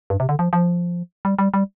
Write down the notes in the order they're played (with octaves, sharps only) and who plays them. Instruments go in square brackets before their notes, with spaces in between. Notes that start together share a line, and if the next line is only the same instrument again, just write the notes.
[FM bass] G2
C3
D3
F3
F3
G3
G3
G3